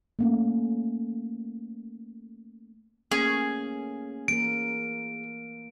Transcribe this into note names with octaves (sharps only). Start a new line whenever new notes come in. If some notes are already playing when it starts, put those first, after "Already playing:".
A3 A#3 C#4
A3 A#3 C#4 G#4
E3 A#3 A#4 D7